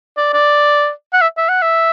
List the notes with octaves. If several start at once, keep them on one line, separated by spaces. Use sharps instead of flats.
D5
D5
F#5
E5
E5
F#5
E5